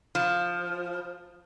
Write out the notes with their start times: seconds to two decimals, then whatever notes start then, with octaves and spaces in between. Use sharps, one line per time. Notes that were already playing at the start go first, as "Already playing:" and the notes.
0.15 F3